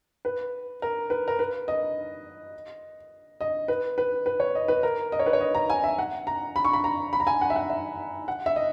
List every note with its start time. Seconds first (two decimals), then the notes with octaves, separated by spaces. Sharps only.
0.25 B4
0.82 A#4
1.10 B4
1.28 A#4
1.39 B4
1.68 D#5
3.41 D#5
3.68 B4
3.98 B4
4.26 B4
4.40 C#5
4.55 D#5
4.68 B4
4.83 A#4
5.12 D#5
5.19 C#5
5.26 B4
5.33 C#5
5.41 D#5
5.55 A#5
5.70 G#5
5.84 E5
5.99 F#5
6.27 A#5
6.56 B5
6.65 C#6
6.73 B5
6.84 A#5
7.13 B5
7.20 A#5
7.27 G#5
7.41 F#5
7.50 E5
7.56 F#5
7.70 E5
8.28 F#5
8.46 E5
8.56 D#5